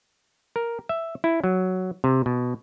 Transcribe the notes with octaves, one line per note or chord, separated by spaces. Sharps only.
A#4
E5
E4
F#3
C3
B2